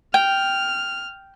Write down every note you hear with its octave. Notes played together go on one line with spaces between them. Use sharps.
G5 F6